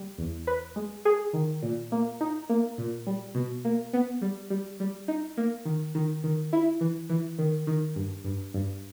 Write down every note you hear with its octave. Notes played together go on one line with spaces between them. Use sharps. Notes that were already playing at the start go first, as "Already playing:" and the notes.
Already playing: G3
E2
B4
G#3
G#4
D#3
A#2
A#3
D#4
A#3
A#2
G3
B2
A#3
B3
G3
G3
G3
D#4
A#3
D#3
D#3
D#3
E4
E3
E3
D#3
D#3
G2
G2
G2